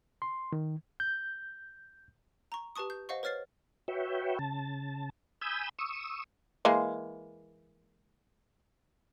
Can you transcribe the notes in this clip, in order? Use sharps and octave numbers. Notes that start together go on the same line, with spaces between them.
C6
D#3
G6
A#5 C#6
G4 B4 A5 C#6 D#6
G6
C5 D#5 F5 F#5 C#6
B4 C#5 F6 A6 C7
F#4 B4 C#5 E5 G5
C#3 A5
G#5 B5 D#6 E6 G6
C#6 D#6 E6
E3 G#3 A#3